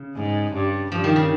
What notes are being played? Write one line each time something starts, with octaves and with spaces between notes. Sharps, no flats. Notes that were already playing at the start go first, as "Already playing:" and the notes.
Already playing: C#3
G#2
G2
G2 F3
D#3
C#3